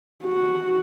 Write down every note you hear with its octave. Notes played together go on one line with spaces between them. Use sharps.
F#4